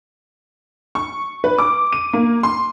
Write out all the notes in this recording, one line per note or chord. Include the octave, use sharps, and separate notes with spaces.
C#6
B4
D6
D#7
A#3
C6